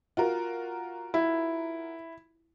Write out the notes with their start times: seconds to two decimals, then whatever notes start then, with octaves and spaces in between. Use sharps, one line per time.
0.17 F4 F#4 A#4
1.14 E4